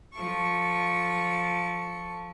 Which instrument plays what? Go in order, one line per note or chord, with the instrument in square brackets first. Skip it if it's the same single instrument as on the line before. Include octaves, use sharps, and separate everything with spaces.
[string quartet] F3 A4 C#6